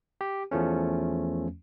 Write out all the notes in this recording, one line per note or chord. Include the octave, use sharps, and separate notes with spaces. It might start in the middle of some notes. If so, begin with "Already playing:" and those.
G4
E2 F3 A3 C#4